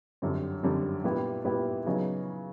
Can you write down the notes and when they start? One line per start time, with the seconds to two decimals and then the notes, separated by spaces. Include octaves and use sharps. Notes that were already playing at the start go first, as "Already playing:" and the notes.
0.22 F#2 D3 G3 C4
0.63 F#2 D3 G3 C4
1.04 A#2 G3 B3 E4 G4
1.45 A#2 G3 B3 E4 G4
1.86 C#3 F#3 B3 D#4